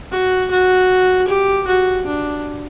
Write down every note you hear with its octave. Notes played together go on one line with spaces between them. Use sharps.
F#4
F#4
G4
F#4
D4